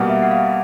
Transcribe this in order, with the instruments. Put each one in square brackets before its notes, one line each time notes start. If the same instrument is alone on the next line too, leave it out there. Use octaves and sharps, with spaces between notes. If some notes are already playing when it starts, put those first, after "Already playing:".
Already playing: [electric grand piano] B2 G3 A#3 [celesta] F#5
[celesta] E5
F#5
F5